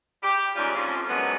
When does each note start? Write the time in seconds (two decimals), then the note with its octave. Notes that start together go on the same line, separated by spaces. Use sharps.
0.23 G4
0.56 G#2 E3 G3 C#4 F4
0.74 F2 A2 F3 C#4
1.09 F#2 D3 F3 F#3 G#3 B3